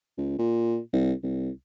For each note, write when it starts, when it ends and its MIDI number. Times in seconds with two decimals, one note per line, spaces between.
0.18 0.37 37
0.38 0.79 46
0.93 1.13 36
1.23 1.50 36